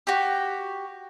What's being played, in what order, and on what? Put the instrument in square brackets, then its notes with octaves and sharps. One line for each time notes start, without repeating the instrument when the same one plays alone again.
[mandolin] F#4 G4